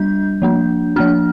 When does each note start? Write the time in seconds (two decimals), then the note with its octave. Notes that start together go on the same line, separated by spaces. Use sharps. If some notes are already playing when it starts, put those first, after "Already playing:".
Already playing: G3 D4 G6
0.42 F3 A#3 D4
0.96 F3 A#3 D4 F6